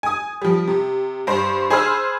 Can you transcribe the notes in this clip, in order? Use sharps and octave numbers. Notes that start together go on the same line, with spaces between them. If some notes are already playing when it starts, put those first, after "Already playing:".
G#5 D#6
F3 G3
C3
G2 C5
G#4 C5 G#5 B5 E6 F6